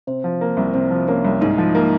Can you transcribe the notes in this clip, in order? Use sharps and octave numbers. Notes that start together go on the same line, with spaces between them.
C3 C5
F3
A#3
C2
C3 C5
F3
A#3 C#4 C#5
C2
G#2 D#4 D#5
F3
A#3